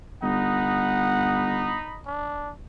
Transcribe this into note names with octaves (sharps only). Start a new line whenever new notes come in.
G1 D#4 D#5 F#5 B5
D4